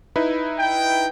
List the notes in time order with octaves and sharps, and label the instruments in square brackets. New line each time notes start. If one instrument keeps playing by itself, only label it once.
[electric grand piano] D#4 E4 B4
[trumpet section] G5